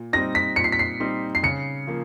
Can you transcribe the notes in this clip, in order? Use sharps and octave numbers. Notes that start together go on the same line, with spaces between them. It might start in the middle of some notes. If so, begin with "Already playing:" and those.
Already playing: A#2
G3 C4 D#4 A#6
B6
A#2 C#7
C7
B6
C7
G3 C4 D#4
C7
C#3 C#7
F3 A#3